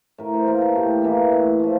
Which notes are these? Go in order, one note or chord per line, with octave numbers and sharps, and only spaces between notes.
A2 A#4
C5
E3 A#3 A#4
A4
A2 G4
E3 A#3
A2
F3 A3